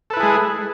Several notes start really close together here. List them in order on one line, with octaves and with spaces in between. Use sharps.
A4 B4 E4 G#4 G#3